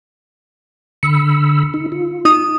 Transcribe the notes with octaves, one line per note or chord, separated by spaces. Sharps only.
D3 B5 E6 C#7
D#4
F4
D#4 D#6